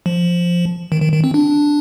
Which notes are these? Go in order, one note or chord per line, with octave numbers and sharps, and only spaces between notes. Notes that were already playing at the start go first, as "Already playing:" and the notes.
F3
D#3
D#3
D#3
C4
D4